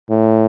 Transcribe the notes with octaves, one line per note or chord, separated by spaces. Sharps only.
A2